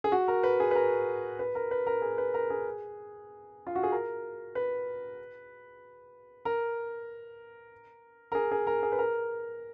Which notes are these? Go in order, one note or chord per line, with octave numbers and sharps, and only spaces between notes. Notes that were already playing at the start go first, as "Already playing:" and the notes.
G#4
F#4
A#4
B4
G#4
B4
A#4
B4
A#4
B4
A#4
G#4
B4
A#4
G#4
F4
F#4
G#4
A#4
B4
A#4
A#4
G#4
G#4
A#4
G#4
B4
A#4